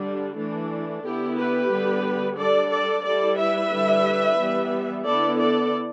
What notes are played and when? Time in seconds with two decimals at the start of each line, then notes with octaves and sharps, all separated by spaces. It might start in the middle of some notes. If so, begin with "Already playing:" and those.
Already playing: D3 G3 D4
0.37 E3 A3 D4
1.04 D3 B3 E4 G4
1.37 G4 B4
1.71 D3 G3 B3
2.38 G3 D4 A4 D5
2.72 A4 D5
3.05 G3 E4 A4 D5
3.39 B4 E5
3.72 D3 G3 E4
4.39 E3 G3 B3
5.06 D3 B3 E4 A4 D5
5.40 A4 D5